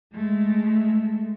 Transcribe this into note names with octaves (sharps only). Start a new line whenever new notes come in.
G#3 A3